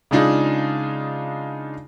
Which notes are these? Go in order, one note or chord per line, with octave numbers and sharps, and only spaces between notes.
C#3 G#3 D4 D#4 F4 G#4